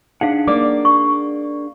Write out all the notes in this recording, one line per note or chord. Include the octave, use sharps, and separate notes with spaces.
D4 D#4 G#4 F5 F#5
A#3 D5 D6
C#6